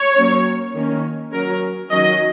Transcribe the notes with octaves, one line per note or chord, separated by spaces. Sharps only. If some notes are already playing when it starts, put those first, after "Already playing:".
Already playing: C#5
F#3 A#3 C#4
D#3 A#3 C#4
F#3 C#4 A#4
D#3 F#3 C#4 D#5